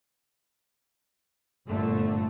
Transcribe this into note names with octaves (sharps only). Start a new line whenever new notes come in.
G1 A#2 D3 A3